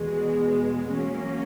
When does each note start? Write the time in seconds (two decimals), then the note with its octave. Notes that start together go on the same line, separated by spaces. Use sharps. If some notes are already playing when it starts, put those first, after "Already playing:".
Already playing: E2 B2 G#3
0.94 F#3 A#3 C#4